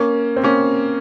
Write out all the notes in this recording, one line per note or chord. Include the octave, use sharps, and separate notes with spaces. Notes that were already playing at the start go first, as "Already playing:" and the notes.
Already playing: A#3 C#4
C4
A#3 C#4